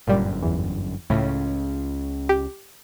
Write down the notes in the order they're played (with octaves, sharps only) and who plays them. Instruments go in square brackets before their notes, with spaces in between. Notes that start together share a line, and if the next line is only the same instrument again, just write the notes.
[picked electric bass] G1 F#2 [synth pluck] A#2 G3
[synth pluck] E2
[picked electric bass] C#2 C#3 C#4 [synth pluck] A2
[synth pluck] G4